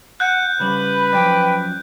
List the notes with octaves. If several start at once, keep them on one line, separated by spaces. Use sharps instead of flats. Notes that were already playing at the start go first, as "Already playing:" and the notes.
F#5 F#6 G6
C#3 G3 B4 B5
F#2 F3 D5 G5